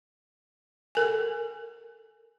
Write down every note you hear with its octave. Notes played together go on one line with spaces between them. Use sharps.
A4 A#4 G#5